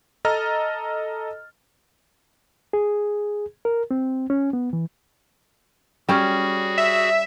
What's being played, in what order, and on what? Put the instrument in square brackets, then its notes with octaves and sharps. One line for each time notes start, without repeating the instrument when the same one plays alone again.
[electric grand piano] A4 D#5 A#5 F6 A6
[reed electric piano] G#4
A#4
C4
C#4
B3
E3
[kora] G3 C#4 [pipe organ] F#4 G#4
[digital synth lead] E5